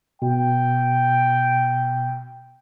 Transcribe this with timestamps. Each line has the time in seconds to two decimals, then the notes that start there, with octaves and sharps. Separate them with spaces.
0.22 B2 G5